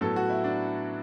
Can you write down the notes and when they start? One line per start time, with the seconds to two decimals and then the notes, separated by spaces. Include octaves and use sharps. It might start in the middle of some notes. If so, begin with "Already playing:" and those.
0.01 A2 F#3 B3 A4
0.16 F#4
0.30 E4
0.44 D4